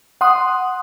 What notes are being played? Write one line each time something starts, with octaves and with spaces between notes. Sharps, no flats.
F#5 C6 D#6